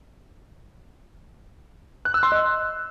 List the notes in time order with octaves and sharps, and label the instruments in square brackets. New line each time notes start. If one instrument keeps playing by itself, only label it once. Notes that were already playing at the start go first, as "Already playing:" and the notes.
[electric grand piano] F#6
E6
C6
D#5